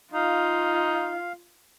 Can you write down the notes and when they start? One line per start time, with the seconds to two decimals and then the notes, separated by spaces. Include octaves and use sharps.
0.14 D#4 F4 F5